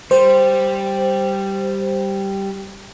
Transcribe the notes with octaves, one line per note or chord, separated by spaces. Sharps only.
G3 C5